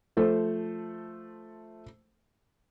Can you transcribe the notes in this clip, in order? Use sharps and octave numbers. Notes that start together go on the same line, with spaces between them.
F3 A3 A4 C5